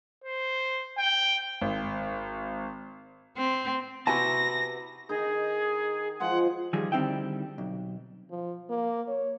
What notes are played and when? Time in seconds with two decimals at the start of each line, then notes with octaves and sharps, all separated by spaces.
0.24 C5
0.98 G5
1.61 G#1
3.37 C4
4.07 C3 B3 E4 F#4 G#5 A5 A#6
5.09 D#3 D#4 G#4
6.20 F3 G#3 G#4 F#5
6.73 D#3 F3 G3 G#4
6.92 D3 G3 C4 D#4 E4 G5
7.58 B1
8.31 F3
8.69 A#3
9.08 C#5